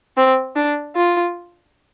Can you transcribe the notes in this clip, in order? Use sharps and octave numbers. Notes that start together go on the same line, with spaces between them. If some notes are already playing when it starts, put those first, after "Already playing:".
C4
D4
F4